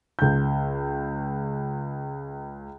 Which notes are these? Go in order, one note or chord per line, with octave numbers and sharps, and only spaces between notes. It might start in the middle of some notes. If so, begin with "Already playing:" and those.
C#2 G6